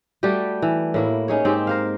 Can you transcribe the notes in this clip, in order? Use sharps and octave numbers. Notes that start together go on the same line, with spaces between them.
G3 A3 F#4 G4
E3
A2 A#3 E4
C#4 D#4 G#4 C#5
G#2 C4 G4
A#4 C5 F5